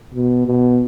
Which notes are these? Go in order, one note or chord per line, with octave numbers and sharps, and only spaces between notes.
B2
B2